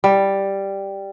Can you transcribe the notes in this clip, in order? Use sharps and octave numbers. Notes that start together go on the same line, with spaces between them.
G3